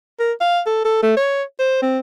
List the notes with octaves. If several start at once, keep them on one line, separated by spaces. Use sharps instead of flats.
A#4
F5
A4
A4
A3
C#5
C5
C4